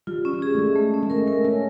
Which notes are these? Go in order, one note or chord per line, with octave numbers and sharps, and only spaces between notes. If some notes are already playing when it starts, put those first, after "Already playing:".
G3 F4
C#4
G3
G#4
A3
G#3 C#4
A3
C#4
G#3
A3 A#4
A3 A#4
C#4 A#4